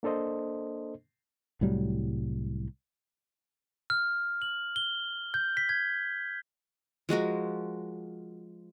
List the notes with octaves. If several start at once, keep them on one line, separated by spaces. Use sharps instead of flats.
A#3 D4 A4 C5 D#5
C2 A2 F#3 G3
F6
F#7
G7
G6
B6
G#6
F3 G#3 F#4 A#4